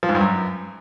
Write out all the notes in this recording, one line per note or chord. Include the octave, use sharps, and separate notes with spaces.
F3
G#2
G2
F#2